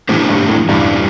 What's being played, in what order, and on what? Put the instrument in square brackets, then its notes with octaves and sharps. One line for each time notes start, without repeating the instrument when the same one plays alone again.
[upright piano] A2 [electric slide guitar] E3 A3 D4 G4 C5
[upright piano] G2
A2
[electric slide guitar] E2 E3 G3 [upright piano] G2